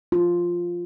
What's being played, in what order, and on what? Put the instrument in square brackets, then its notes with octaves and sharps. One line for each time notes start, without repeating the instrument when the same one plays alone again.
[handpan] F4